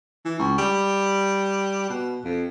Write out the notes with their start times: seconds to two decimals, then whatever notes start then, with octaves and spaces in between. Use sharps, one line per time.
0.25 E3
0.39 C#2
0.58 G3
1.89 B2
2.24 F2